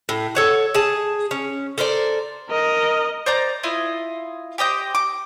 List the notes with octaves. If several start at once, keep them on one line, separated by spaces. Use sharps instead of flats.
A2
A4 C#5 F#5
G#4 A5
C#4
A4 A#4 C5 D5
A#4 D#5
C5 D5 A#5 G6
E4 F4 D#5
G4 C5 D#5 G5
D6